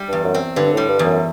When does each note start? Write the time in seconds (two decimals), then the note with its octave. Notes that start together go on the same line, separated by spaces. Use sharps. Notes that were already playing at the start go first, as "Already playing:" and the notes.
Already playing: G3
0.08 E2 G2
0.24 F#2
0.34 C4
0.56 G2 D3
0.73 A2 G3
0.88 G2
0.99 E2
1.05 F#2